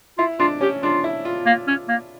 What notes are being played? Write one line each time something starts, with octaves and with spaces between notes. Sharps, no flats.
E4 F4
D4 F4
C#4 G4
D4 F4
E4
F4
A#3
C#4
A#3